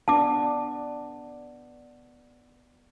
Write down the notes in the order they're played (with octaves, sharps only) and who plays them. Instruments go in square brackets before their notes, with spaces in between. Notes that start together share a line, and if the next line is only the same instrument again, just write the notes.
[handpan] B3 D4 [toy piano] A5 D6